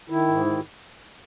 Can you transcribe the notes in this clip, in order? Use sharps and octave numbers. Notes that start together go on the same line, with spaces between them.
D#3 E4
G#2
D#3